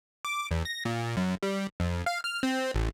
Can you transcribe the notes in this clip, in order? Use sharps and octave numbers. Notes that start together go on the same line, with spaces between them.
D6
E2
A#6
A#2
F#2
G3
F2
F5
F6
C4
A1